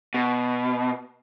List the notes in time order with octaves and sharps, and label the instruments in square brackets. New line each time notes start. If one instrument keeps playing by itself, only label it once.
[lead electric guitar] B2